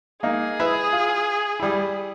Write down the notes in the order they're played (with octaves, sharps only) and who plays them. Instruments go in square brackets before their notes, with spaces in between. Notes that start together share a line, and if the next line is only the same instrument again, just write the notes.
[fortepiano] A#3 D#4 [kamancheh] G#4
[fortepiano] E4 B4 E5
F4
G3 E4